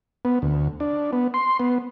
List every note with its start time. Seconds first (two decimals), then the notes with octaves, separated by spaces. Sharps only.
0.25 B3
0.42 D2
0.80 D4
1.13 B3
1.34 C6
1.60 B3